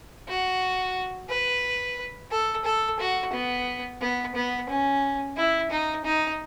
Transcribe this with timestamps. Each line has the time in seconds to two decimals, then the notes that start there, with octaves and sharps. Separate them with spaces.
0.28 F#4
1.29 B4
2.31 A4
2.65 A4
3.00 F#4
3.33 B3
4.01 B3
4.35 B3
4.69 C#4
5.37 E4
5.71 D#4
6.05 D#4